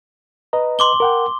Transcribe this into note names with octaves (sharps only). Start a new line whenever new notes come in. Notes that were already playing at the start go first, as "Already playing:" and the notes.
B4 D#5 A#5
C6 D6 G7
A#4 F#5 G5